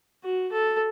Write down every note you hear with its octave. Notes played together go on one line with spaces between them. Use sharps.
F#4
A4